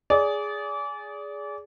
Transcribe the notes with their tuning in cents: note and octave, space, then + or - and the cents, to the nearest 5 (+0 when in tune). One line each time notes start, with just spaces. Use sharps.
G#4 +0 D5 -30